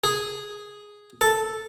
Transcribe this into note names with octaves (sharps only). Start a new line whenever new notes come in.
G#4
A4